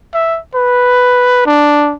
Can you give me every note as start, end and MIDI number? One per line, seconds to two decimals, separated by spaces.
0.14 0.39 76
0.55 1.44 71
1.46 1.94 62